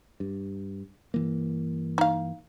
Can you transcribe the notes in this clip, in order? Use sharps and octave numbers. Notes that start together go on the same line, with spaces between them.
G2
G2 E3 A#3
D#4 F5